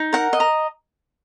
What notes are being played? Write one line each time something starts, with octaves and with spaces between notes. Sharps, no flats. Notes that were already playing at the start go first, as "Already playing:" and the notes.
Already playing: D#4
A#4 F#5
D#5
A#5